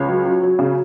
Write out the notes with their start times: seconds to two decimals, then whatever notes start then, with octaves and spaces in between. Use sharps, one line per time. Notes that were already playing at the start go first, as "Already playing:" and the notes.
Already playing: C#2 C#5
0.08 F#3
0.26 F#3
0.43 F#3
0.59 C#3